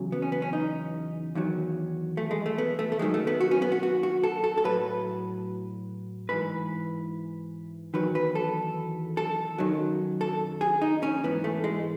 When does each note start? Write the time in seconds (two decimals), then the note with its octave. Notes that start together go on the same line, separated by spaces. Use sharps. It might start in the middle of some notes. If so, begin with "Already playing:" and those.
Already playing: E2 C#3 F#3
0.12 B3
0.22 C#4
0.32 B3
0.42 C#4
0.53 D#4
1.35 E2 D#3 F#3
2.17 A3
2.31 G#3
2.46 A3
2.58 B3
2.79 A3
2.92 A3
2.99 F#2 D#3 F#3 G#3
3.14 A3
3.27 B3
3.41 F#4
3.51 C#4
3.62 B3
3.72 F#4
3.83 F#4
4.03 F#4
4.24 A4
4.44 A4
4.57 A4
4.64 A2 F#3 B4
6.29 G#2 E3 B4
7.94 E2 D#3 F#3 B4
8.15 B4
8.35 A4
9.17 A4
9.58 F#2 D#3 F#3
10.21 A4
10.61 G#4
10.81 D#4
11.03 C#4
11.24 G#2 E3 B3
11.44 A3
11.64 G#3